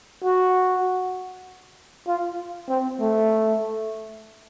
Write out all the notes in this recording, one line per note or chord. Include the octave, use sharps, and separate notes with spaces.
F#4
F4
C4
A3